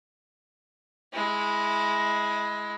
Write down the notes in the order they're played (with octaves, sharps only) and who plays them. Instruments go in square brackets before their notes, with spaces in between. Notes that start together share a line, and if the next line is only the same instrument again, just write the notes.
[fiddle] G#3 E4